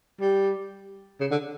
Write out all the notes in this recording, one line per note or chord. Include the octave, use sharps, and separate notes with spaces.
G3
C#3
D3